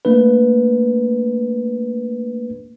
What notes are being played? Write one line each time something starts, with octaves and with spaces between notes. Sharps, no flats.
A3 A#3 D4 B4